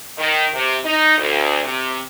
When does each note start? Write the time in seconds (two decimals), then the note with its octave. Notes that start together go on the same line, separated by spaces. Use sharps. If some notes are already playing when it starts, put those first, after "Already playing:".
0.18 D#3
0.54 C3
0.85 D#4
1.18 D2
1.63 C3